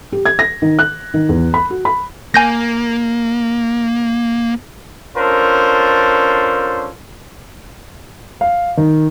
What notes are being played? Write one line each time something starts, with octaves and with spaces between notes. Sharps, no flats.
G4
G#6
A#6
D#3
F#6
D#3
E2
B5
F#4
B5
A#3 G#5 G6 A#6
C#4 D4 F4 A4 A#4 C5
F5
D#3